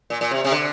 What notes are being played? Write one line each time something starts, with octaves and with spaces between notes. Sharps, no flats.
A#2
A#2
C3
C3
D3